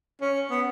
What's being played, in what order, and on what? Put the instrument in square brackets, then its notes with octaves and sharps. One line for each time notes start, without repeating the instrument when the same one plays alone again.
[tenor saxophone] C#4
B3